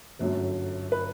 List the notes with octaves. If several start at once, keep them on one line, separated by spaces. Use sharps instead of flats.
G1 F#2 D3 F#3 A3
B4